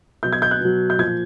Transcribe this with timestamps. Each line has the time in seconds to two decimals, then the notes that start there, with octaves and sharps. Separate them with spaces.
0.23 B2 F#3 G6
0.33 G#6
0.42 G6
0.51 F#6
0.61 B2 F#3
0.90 G6
0.99 A#2 F3 G#6